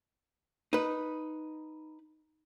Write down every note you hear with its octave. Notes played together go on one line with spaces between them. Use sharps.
D#4 B4